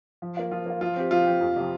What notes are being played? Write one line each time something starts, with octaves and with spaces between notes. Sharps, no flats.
F3
A#3 F4
F3 F4
A#3 F4
F3 F4
C4 G4
F3 F4
C4 G4
F2
C3 F3